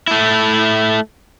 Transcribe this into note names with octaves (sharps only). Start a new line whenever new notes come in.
A3 E4